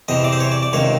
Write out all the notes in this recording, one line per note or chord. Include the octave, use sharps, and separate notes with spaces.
E2 C3 E3 D#5
D5
C5
C#5
D5
D5
C#2 C3 D#3 C#5